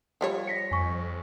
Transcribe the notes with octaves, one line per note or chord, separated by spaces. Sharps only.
F3 G3 C#5
A#6 B6 C#7
F2 G#5 C#6